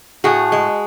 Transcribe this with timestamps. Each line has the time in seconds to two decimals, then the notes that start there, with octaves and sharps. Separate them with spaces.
0.24 A2 F#4 G#4
0.52 G#3